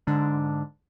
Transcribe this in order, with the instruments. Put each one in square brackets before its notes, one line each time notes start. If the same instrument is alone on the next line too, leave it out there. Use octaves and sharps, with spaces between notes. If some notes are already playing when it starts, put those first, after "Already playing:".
[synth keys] G#2 D3 D4